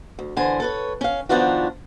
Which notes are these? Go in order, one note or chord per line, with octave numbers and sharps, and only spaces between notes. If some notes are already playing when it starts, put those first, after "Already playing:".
D2
D3 E3 C5 G#5
A4 B4 C#5
C#4 F5
D#3 F3 B3 D4 F4 F#4